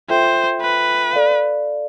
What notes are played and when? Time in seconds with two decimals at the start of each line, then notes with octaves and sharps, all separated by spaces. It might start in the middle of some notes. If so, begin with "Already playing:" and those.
0.09 F4 A4 C5 E5 G5
0.61 B4
1.13 A4 D5 F5